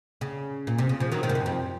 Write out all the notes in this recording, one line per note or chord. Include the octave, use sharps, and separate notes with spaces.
C#3
A#2
C3
C#3
C#3 F3
D#3 F#3
C3 D#3
G#2
F#2
F2